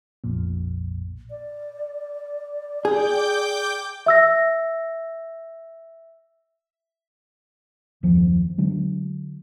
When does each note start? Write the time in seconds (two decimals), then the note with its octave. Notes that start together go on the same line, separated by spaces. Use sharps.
0.24 A#1 F2 A#2
1.30 D5
2.85 G#4 G5 D6 G6
4.06 E5 E6 A#6
8.03 F#1 D#2 F3
8.58 D3 F#3 G#3